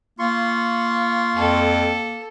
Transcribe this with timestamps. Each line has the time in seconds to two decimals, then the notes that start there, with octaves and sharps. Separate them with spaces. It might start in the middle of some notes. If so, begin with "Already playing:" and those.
0.19 A#3 F4 C6 C#6
1.36 F2 A4